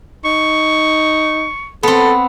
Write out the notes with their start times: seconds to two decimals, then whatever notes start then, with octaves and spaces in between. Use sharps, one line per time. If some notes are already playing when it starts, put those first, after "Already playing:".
0.25 D#4 C#6
1.83 B3 C4 A4